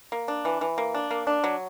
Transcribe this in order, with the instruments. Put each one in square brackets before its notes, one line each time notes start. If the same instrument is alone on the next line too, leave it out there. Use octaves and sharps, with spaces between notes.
[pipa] A#3
D4
E3
E3
A#3
D4
A#3
D4
F#3